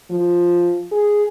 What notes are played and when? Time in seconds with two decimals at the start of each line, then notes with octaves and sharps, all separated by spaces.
0.10 F3
0.92 G#4